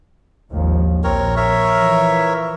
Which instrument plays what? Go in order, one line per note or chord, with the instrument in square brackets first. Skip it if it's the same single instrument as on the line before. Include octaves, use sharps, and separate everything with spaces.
[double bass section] G#1 D#2 F3
[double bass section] A#1 [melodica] C4 A#4 C#5
[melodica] A#4 C#5 E5
[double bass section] E3 F3